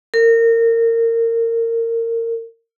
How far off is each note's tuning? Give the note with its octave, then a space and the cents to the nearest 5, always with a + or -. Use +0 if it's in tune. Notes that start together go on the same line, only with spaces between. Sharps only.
A#4 -25